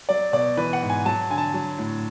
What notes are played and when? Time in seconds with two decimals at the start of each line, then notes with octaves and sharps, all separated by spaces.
0.09 F#3 D5
0.33 B2 D5
0.57 E3 B4
0.73 F#5
0.82 G#2
0.90 G#5
1.05 F#3 A5
1.30 D3 G#5
1.38 A5
1.54 F#3
1.78 A2